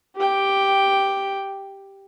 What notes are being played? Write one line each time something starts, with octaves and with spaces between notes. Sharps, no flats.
G4 G5